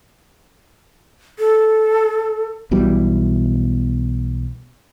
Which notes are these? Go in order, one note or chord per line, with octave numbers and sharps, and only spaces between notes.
A4
B1 B2 E3 G3